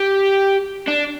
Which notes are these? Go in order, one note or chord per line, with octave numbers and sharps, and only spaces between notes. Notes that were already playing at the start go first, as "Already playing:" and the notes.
Already playing: G4
D4